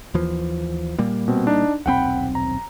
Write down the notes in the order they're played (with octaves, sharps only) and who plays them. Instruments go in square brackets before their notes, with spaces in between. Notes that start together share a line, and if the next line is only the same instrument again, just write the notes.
[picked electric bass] D#2 E3 F3
A#2 G3 A#3
[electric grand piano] B2 C4
D4 D#4
[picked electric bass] D#1 B1 C4 [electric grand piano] F#5 G5 B5
[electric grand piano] A#5